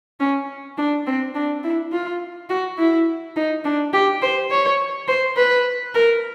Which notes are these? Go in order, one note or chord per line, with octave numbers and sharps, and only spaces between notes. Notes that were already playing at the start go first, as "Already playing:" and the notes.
C#4
D4
C4
D4
E4
F4
F#4
E4
D#4
D4
G4
C5
C#5
C5
B4
A#4